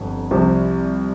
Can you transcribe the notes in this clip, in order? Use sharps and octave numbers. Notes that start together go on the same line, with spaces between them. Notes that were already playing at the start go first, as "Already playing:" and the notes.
Already playing: G1 F2
C2 C3 F3